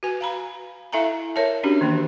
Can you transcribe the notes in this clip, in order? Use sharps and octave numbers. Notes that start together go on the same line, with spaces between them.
F#4 B4 G#5
F5 A#5 B5
E4 A4 E5 F5 G#5 A#5
A#4 C#5 E5 A5
C#4 D4 F#4 G4
D#3 E3 A#3 D4